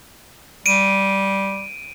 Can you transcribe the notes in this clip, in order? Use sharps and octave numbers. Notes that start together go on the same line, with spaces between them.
G3 D7 D#7